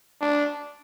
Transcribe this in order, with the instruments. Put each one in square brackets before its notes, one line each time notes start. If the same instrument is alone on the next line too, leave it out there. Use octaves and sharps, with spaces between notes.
[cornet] D4